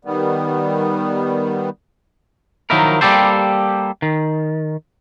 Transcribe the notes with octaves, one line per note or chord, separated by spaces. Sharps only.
D#3 G3 B3
D#3 F3 F#3 D#4 E4 A#4
G3 A#3 G4 A4 C5
D#3